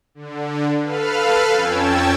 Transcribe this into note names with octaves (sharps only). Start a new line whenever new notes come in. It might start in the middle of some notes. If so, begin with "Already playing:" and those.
D3
A4 B4 F5 F6
F2 C#4 G5 A5 E6 G#6